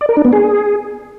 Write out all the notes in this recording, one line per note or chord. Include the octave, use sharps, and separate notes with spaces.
D5
A#4
D4
B3
G#4